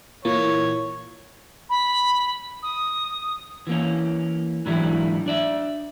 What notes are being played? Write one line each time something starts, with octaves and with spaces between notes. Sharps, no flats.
A#2 E3 A#3 C#5
B5
D#6
E3 A#3 C#4
G#2 D3 E3 F#3 G3 E4
D4 D5 E5